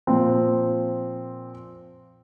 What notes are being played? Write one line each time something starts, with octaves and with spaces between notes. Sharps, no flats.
A#2 F3 C4